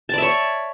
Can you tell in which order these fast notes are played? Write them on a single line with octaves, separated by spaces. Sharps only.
A5 D5 E5 C#5